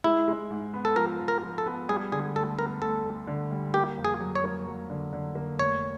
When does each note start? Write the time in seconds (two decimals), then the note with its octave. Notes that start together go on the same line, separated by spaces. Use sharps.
0.04 G#3 E4
0.28 G#3
0.51 G#2
0.74 B3
0.85 A4
0.96 F3 A#4
1.19 F3
1.28 A#4
1.43 F3
1.58 A4
1.66 B3
1.89 G3 G#4
2.12 D3 G#4
2.36 D2 A4
2.58 B3 A#4
2.81 D2 A4
3.05 D2
3.27 D3
3.51 G3
3.74 A#3 G4
3.98 F2
4.05 G#4
4.20 F#3
4.35 C#5
4.44 A#3
4.67 F#3
4.90 D3
5.13 D3
5.35 A#3
5.59 F1 C#5